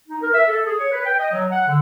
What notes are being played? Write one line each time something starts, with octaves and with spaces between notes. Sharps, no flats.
D#4
A#4
E5
A4
G#4
C#5
B4
G5
D#5
F#3
F#5
D3